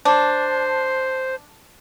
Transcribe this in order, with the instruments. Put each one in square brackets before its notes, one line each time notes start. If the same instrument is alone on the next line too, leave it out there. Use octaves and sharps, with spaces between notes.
[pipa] D4 [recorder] C5